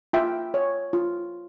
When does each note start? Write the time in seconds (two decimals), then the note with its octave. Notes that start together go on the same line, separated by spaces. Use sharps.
0.13 F4 E5 G5
0.54 C#5
0.93 F4